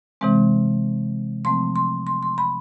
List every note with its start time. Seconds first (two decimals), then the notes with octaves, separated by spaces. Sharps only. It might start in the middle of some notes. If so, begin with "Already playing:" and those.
0.21 C3 E3 G#3 C4
1.45 C3 F3 A3 C4 C6
1.76 C6
2.07 C6
2.23 C6
2.38 B5